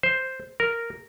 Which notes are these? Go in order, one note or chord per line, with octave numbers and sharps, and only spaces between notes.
C5
A#4